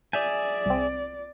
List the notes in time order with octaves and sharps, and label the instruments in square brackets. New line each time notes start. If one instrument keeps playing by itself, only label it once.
[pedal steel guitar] G#4 E5 G#5 [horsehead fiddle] D5 [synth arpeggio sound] G6
[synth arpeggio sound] C2 C4